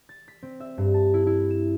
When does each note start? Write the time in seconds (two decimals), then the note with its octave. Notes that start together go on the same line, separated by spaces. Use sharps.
0.09 A6
0.28 B6
0.43 C4
0.60 E5
0.78 G2
0.94 A5
1.14 E4
1.27 E4
1.50 E7